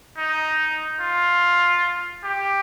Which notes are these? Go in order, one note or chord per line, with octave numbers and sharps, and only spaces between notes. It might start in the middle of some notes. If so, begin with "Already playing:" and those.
D#4
F4
G4